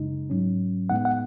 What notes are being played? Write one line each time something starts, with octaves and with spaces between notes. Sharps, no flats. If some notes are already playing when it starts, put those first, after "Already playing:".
Already playing: F#2 C#3 G#3 D#4
G#2 F#3 C#4
A2 G#3 B3 D#4 F#5
F#5